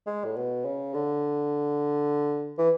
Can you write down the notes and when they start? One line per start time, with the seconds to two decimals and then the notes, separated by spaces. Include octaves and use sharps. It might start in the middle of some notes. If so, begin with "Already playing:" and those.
0.07 G#3
0.25 A2
0.36 B2
0.65 C#3
0.94 D3
2.58 E3